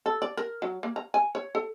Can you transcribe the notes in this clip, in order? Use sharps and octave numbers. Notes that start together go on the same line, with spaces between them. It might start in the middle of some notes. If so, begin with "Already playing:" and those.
A4
D5
A#4
F#3
A#3
A#5
G#5
C#5
A4